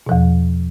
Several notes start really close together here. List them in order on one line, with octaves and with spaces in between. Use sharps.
B2 F3 E2